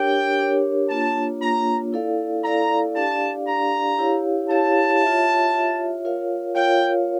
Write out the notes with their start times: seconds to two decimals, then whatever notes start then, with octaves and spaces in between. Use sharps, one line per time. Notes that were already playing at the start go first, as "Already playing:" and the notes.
Already playing: D4 G4 A#4 C#5 G5
0.39 D4 G4 A#4 C#5
0.90 A#3 D4 F4 C#5 A5
1.42 A#3 D4 F4 C#5 A#5
1.93 E4 A4 D5 F5
2.44 E4 A4 D5 F5 A#5
2.95 D4 G4 D5 F5 A5
3.47 D4 G4 D5 F5 A#5
3.99 E4 G4 C#5 F5
4.50 E4 G4 C#5 F5 A5
5.02 F4 C#5 E5
5.53 F4 C#5 E5
6.05 F4 A#4 C#5 F5
6.55 F4 A#4 C#5 F5 G5